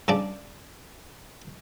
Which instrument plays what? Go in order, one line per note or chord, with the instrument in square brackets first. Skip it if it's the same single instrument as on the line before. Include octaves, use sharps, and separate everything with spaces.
[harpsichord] C#3 D4 D5